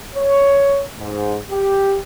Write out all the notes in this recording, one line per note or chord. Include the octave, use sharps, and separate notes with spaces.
C#5
G#2
G4